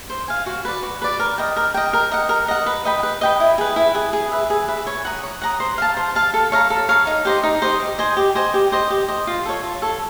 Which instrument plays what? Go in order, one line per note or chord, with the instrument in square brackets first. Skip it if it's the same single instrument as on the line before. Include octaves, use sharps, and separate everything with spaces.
[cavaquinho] C5
F5 G#5
F#4
B4 D5
F#4
B4 D5
A#4
D#5 G5
A#4
D#5 G5
A#4
D#5 F#5
A#4
D#5 F#5
B4
D#5 G5 B5
B4
D#5 G5 B5
E4
G#4 B4
E4
G#4 B4
G#4
B4 E5
G#4
B4 E5
C#5
F#5 A#5 D#6
C#5
F#5 A#5 D#6
C5
F5 A5
C5
F5 A5
A4
C#5 F5 A#5
A4
C#5 F5 A#5
D#4
G4 C5 D#5
D#4
G4 C5 D#5
G4
C5 D#5 G#5
G4
C5 D#5 G#5
G4
C5 D#5
G4
C5 D#5
F4
A4 C#5
F4
A4 C#5